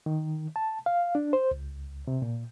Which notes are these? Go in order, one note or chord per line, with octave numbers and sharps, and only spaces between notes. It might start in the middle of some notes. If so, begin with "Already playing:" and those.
D#3
A5
F5
D4
C5
C#2
C3
A#2